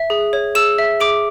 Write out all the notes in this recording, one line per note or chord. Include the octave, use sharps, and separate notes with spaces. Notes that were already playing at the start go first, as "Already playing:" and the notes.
Already playing: E5
G#4
C#5
G#4 E6 E7
E5
G#4 D6 D7